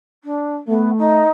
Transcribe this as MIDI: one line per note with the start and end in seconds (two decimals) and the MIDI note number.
0.24 0.54 62
0.67 1.22 57
0.67 0.90 59
0.98 1.29 63